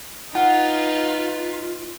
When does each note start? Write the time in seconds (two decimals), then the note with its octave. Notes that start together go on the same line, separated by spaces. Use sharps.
0.35 D#4 F4 B4 F#5